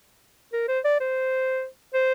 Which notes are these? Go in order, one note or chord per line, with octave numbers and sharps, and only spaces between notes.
A#4
C5
D5
C5
C5